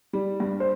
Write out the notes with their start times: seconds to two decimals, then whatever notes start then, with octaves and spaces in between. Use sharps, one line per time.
0.13 G3
0.40 G2
0.60 C5